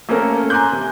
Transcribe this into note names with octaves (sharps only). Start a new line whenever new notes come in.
A3 A#3 C4 C#4 A4 A#4
G#5 A#5 C6 D6 F#6 G6
C3